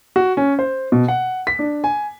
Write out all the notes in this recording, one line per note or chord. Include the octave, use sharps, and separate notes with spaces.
F#4
C#4
C5
B2
F#5
B6
D4
G#5